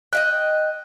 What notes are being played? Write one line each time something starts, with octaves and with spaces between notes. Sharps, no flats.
D#5 E5 G5 F#6